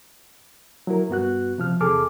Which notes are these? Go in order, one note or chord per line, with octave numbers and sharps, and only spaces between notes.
F#3 E4 A#4
G2 B3 F#4 F#6
C3 F3 F6
E2 C3 G#4 A4 D6 F6